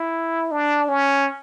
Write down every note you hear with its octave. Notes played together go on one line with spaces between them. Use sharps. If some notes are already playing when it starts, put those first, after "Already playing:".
Already playing: E4
D4
C#4